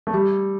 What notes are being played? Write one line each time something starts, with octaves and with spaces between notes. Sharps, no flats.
A3
G3